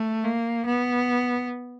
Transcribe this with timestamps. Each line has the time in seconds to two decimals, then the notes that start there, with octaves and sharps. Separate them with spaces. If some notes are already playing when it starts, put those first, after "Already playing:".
Already playing: A3
0.24 A#3
0.66 B3